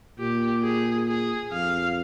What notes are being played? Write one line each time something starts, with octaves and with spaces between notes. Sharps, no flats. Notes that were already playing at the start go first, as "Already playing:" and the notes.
A#2 G4
G#4
G#4
F2 F5